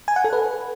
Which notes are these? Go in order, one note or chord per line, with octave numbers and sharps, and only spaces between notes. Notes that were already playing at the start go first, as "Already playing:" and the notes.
G#5
F#5
A4
B4